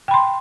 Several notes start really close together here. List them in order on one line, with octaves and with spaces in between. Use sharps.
G5 B5 C6